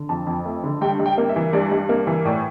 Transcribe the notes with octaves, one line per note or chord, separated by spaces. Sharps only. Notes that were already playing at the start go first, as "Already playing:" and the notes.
Already playing: D3
F2 A5
F2
A3
D3
G2 G5
G2
G5
A#3
E5
E3
G2 D5
G2
A#3
E3
A2 D5